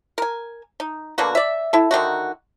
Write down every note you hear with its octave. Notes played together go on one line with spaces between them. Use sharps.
A#4 G#5
D#4
B2 D3 A#3 F#4
D5 E5
E4 A4
D3 D#3 D#4 F#4